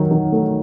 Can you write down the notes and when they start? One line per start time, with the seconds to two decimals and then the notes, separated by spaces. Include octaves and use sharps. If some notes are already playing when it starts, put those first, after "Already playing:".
Already playing: D#3 F#3
0.11 D#3
0.32 A3